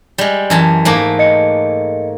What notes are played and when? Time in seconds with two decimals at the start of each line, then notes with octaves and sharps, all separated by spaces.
0.18 G3 G#3
0.50 F#2 E3 A5
0.85 G#2 A3 A#3
1.19 D#5 C#7